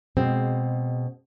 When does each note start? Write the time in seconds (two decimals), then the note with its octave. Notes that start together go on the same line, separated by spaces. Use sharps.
0.17 B2 G#3 C4